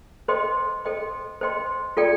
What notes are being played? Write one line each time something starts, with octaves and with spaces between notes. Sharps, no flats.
A4 C5 D#5 G5 C6
A4 C5 D#5 G5 C6
A4 C5 D#5 G5 C6
F4 A4 D5 G5